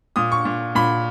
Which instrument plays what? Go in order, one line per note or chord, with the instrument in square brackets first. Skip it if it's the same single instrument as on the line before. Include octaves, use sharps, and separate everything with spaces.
[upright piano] A#2 D#6
C#6
A#2
A#2 B5